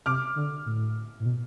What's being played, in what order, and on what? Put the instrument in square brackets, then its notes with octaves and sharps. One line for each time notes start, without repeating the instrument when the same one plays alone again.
[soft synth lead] C3 [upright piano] D6 F6
[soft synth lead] D3
A2
A2
B2